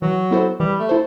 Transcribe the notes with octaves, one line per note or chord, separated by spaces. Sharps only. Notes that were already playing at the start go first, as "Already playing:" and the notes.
E3 F#3
B3 E4 A4 C5
E3 G3
A3
E4 A4 C5